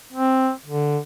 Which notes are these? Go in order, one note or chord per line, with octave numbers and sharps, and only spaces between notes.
C4
D3